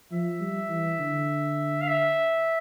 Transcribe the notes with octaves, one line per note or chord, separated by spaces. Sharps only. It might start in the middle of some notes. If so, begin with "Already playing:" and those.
F3 E5
G3
E3
D3
F5
E5